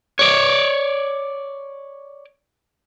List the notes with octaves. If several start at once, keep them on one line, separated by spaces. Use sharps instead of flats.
C#5 D5